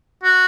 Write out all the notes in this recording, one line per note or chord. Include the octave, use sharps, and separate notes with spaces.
F#4